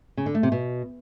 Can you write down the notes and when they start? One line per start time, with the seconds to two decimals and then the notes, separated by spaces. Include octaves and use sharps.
0.17 C#3
0.26 D3
0.35 A3
0.43 C3
0.52 B2